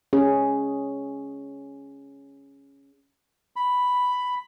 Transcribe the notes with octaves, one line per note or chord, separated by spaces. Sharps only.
C#4 G#4
B5